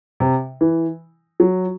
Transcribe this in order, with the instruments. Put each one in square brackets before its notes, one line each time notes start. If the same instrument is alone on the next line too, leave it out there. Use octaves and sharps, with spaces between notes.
[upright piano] C3
E3
F#3